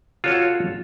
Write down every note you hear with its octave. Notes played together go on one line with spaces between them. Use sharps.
F4 F#4 A4 C#5